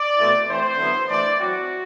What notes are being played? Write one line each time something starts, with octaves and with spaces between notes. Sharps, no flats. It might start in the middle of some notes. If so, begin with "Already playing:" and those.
Already playing: D5
B2 A3 C4 E4
E3 A3 C4 C5
D3 F#3 B3 E4
E3 A3 D4 D5
F#3 C4 E4 F#4